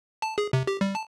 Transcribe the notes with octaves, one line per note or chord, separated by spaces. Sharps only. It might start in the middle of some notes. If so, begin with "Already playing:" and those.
A5
G#4
C3
G4
G3
A5